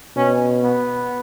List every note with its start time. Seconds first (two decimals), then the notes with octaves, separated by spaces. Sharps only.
0.16 B2 C#4
0.64 B3